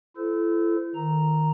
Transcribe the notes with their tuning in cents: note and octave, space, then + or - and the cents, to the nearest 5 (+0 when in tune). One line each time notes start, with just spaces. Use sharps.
E4 +40 A4 -15 C5 -35
D#3 -5 A#5 +0